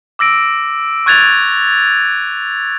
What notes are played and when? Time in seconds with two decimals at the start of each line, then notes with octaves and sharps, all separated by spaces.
0.19 D6 E6 A#6 D7
1.06 C#6 F#6 G#6 A6 F7